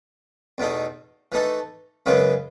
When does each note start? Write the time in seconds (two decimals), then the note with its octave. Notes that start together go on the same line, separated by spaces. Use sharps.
0.58 E2 B2 A3 D#4
1.32 E3 A3 D#4 A4
2.06 F#2 C#3 E3 G#3 B3